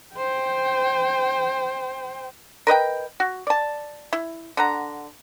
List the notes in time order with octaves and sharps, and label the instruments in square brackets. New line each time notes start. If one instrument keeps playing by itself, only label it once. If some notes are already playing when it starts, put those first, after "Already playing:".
[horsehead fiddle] C5 G5
[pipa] A#4 B4 D#5 G5
F#4
D5 A5
E4
D3 F#5 A#5